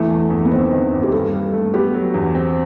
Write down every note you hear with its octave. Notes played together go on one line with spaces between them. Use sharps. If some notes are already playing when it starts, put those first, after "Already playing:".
Already playing: E2 E3 A3
A3
E2
B3
D#3 C4
D#3
D#2
G4
G2 A4
G2
A3
B3 G4
F#3
E2
C4